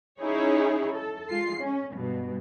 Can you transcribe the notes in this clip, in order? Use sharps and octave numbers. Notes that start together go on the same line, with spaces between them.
C#4 D#4 E4 G#4 C#5
A4
G#3 F4 C7
C#4
G2 B2